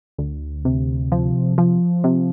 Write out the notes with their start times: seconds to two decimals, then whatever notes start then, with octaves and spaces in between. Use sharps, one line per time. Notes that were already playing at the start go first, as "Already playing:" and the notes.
0.18 D2
0.65 C3
1.12 F3
1.58 F3
2.04 C3